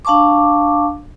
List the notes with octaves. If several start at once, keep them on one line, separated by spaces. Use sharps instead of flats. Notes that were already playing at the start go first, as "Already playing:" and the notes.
D4 F5 A5 C#6 D6